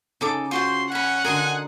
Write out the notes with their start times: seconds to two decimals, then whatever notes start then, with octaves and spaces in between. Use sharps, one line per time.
0.21 C#3 D#4 A4 D6
0.51 F4 F#4 C5 C6
0.92 C#4 F#5 G#5 B5
1.24 D3 D#4 F#4 A#4 D#5 G#5 C6